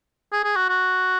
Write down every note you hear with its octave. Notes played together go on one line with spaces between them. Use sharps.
G#4
G#4
F#4
F#4